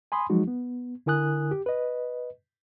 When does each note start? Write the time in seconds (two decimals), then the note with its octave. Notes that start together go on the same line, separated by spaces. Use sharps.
0.12 G#5 B5 C6 D#6
0.30 F3 F#3 G#3 D#4 F#4
0.47 B3
1.06 D3 E4 A#4 G#5 D#6 F#6
1.51 G4
1.66 B4 D#5